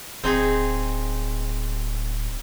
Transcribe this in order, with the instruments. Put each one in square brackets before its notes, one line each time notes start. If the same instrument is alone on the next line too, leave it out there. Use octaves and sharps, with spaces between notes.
[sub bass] D1 [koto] C4 D#4 G#4